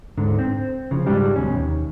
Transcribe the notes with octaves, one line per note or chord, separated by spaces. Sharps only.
D2 G#2 D3
C4
C#3 F3
C#2 G#2 G3 G#3 G4
D2 B2 C#4
D#2